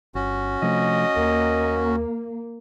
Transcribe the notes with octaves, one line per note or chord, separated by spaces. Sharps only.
G1 C#4 F#4
C3 F3 A3 D#5
D#2 A#3